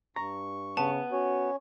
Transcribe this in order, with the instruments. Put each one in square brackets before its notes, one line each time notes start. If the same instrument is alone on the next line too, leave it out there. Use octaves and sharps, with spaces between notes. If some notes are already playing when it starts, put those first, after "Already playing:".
[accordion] G2 C#6 [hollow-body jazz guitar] A#5
[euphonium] C#3 [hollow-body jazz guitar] B3 [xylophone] A5
[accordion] C#4 C#5 [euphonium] F#4